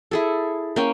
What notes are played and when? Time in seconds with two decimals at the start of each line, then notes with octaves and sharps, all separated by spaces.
0.11 E4 G#4 A4
0.76 A#3 C#4 G5